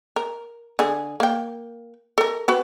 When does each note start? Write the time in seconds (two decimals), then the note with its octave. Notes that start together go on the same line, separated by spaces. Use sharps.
0.16 A#4
0.79 D3 G#4
1.20 A#3 G5
2.18 A4 A#4
2.48 C4 F#4 B4